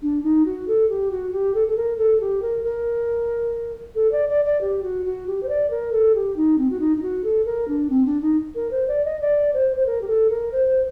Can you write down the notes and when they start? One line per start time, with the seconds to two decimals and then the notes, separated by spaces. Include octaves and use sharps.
0.02 D4
0.23 D#4
0.45 F#4
0.67 A4
0.89 G4
1.11 F#4
1.32 G4
1.54 A4
1.67 A4
1.76 A#4
1.97 A4
2.20 G4
2.42 A#4
2.63 A#4
3.95 A4
4.11 D5
4.28 D5
4.44 D5
4.61 G4
4.82 F#4
5.04 F#4
5.27 G4
5.42 C5
5.48 D5
5.70 A#4
5.92 A4
6.14 G4
6.36 D#4
6.58 C4
6.69 F#4
6.79 D#4
6.96 D#4
7.02 F#4
7.23 A4
7.45 A#4
7.67 D4
7.89 C4
8.05 D4
8.21 D#4
8.55 A#4
8.71 C5
8.87 D5
9.04 D#5
9.20 D5
9.53 C5
9.76 C5
9.86 A#4
10.01 G4
10.08 A4
10.29 A#4
10.52 C5